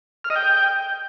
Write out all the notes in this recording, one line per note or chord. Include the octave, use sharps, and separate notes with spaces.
F6
D#5
G5